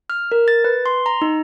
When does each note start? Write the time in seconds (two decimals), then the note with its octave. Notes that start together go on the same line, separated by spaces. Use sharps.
0.10 F6
0.32 A#4
0.48 A6
0.64 B4
0.86 C6
1.06 A#5
1.22 D#4